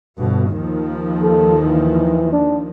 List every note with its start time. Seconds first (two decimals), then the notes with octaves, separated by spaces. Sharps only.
0.17 G1 B2
0.50 D#2 D#3 F3
1.22 A4
1.67 E3
2.32 D4